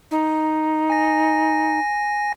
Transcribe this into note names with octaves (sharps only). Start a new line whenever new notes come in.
D#4
G#5 A#6